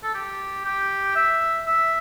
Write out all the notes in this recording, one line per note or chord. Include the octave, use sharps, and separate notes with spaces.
A4
G4
G4
E5
E5